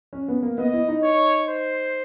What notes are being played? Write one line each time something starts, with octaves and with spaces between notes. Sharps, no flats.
C#4
B3
A#3
B3 D#5
E4
D#4
C#5
C5